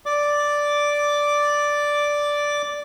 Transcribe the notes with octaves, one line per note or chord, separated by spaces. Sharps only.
D5 D6